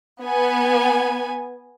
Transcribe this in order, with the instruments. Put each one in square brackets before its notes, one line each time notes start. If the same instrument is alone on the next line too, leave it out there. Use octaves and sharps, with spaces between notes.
[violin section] B3 G#5